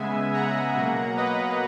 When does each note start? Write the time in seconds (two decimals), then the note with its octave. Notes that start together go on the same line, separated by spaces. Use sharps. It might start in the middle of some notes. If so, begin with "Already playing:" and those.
Already playing: C#3 G#3 B3 E5 G#5
0.33 F#5 A#5
0.75 B2 F#3 A#3
1.17 B4 D#5